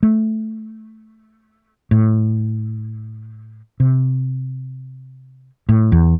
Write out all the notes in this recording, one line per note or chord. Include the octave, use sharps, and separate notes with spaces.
A3
A2
C3
A2
E2